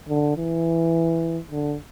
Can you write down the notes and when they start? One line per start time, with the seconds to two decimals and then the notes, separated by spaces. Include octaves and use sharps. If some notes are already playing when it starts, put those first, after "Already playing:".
0.09 D3
0.37 E3
1.51 D3